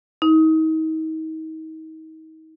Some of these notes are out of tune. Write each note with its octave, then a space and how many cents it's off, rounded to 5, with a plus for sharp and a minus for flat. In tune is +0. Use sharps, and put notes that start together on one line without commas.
D#4 +35